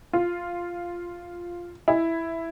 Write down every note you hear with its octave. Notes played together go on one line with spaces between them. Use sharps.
F4
E4